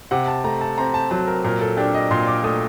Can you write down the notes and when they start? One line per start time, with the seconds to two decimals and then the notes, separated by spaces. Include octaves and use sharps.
0.11 C3 F#5
0.28 A5
0.44 A3 A#5
0.61 A5
0.78 C4 A#5
0.94 A5
1.11 F#3 A5
1.27 A#4
1.44 A#2 A#4
1.61 A4
1.77 D4 G4
1.94 D#5
2.11 A#2 C6
2.27 D6
2.44 A3 D#6